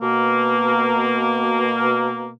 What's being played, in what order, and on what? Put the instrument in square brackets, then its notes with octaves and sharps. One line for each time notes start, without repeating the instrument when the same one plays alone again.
[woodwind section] B2 A#3